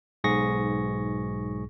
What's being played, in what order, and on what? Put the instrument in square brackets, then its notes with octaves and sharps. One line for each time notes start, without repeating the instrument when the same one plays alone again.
[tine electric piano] B1 G#2 G#4 C#6 A#6